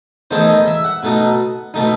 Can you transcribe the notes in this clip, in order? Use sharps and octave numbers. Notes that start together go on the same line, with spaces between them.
E2 D#3 A3 D#4 C5
D#5
E5
F#5
B2 A3 D#4
B2 A3 D#4